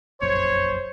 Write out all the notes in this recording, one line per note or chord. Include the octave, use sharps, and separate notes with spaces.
F1 A#1 F#2 C5 C#5